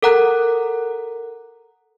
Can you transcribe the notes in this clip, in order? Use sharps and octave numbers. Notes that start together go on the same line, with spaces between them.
A4 A#4 F#5 A#5 F#6